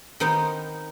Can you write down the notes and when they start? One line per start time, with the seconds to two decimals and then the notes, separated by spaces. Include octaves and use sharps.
0.20 D#3 B3 C4 D#4 C5 D#5